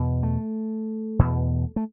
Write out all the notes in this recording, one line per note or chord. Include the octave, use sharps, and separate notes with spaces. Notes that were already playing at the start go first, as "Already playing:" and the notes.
Already playing: E2 B2
A3
E2 B2
A3